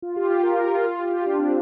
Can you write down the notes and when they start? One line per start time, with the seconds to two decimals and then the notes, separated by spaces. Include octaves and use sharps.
0.02 F4
0.16 G4
0.30 F4
0.43 A#4
0.64 F4
0.75 F4
0.85 F4
0.99 G4
1.11 F4
1.26 D4
1.39 C4